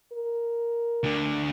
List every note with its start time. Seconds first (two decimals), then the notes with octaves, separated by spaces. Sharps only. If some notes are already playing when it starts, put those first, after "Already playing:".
0.13 A#4
1.03 D2 D3